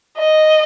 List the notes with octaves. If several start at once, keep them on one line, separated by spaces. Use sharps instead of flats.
D#5